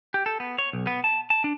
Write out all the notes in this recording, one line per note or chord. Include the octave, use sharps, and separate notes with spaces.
G4
A4
B3
C#5
B1
B3
A5
A5
D4